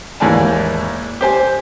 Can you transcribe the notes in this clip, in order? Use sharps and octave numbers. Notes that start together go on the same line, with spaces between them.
D#2 G#2 E3 D5 G#5 A5
G4 C5 G#5